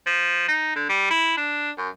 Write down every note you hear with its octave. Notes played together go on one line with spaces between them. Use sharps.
F3
D#4
D3
G3
E4
D4
F#2